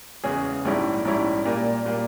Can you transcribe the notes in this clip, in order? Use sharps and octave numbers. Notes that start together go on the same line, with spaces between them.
E2 C#3 G#3 C#4 G#4
A#1 G#2 G3 C#4 E4
A#1 G#2 G3 C#4 E4
A#2 G3 A#3
A#2 G3 A#3